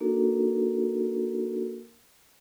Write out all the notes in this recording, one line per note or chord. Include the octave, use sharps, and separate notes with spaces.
A#3 D4 D#4 F#4 A4 A#4